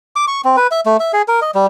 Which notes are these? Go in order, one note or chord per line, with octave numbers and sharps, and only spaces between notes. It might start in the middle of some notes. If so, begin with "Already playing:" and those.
D6
C#6
C4
B4
E5
A3
E5
G#4
A#4
D#5
G3